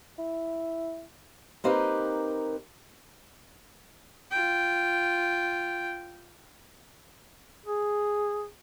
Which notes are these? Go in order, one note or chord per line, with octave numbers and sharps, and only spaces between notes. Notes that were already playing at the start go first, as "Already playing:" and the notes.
E4
A#3 C4 D#4 G4 A#4 B4
F4 G5
G#4